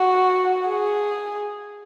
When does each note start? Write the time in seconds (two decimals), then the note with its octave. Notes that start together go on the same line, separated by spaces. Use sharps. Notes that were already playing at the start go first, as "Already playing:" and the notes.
Already playing: F#4
0.68 G#4